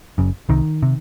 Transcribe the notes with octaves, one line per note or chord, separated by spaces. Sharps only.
F#1 F#2 C#3
C2 C3 D#3
C3